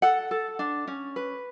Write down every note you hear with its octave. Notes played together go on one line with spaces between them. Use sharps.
A4 F#5
A4
D4
C#4
B4